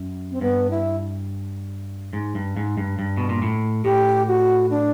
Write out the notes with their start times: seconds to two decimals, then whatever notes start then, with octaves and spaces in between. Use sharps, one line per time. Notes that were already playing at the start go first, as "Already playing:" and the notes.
Already playing: F#2
0.31 C4
0.41 G2 B3
0.70 E4
2.13 G#2
2.35 G2
2.57 G#2
2.78 G2
2.99 G2
3.17 B2
3.29 A#2
3.42 A2
3.84 A2 G4
4.27 F#4
4.70 D4